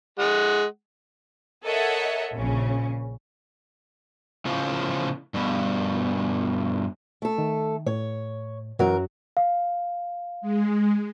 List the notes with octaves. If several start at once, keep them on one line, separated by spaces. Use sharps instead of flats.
G#3 F#5
A4 A#4 C#5 D#5 E5 F#5
A#1 C#3 C#4
A2 C#3 F3 F4
G2 B2
A3 A4
D#3
A2 C#5
F#2 E3 F#3 F#4 A#4
F5
G#3